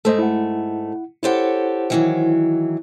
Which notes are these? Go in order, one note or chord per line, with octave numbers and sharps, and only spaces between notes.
G#2 A3 A4 C5 D#5
E4 F#5
E4 G4 A4 C5 C#5 F#5
D#3 E3 F#3